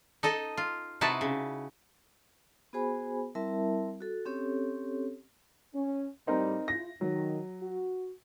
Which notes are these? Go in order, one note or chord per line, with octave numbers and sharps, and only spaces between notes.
D#4 A4 D#5
F4
C3 D#4 E4 F#4 B4 A5
C#3
B3 F#4 G#4 C5 G#5 B5
G3 C4 E4 A#4 E5 A5
F#4 A4
C4 C#4 G4 A4 C#5
C#4
A2 G3 C4 D#4 A#4
E4 F4 A#6
D#3 F#3
F#4